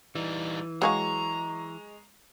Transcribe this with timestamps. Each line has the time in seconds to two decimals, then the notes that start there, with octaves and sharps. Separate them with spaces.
0.15 E3 G3 D#4
0.82 F#3 G#3 G#4 F5 A#5 C#6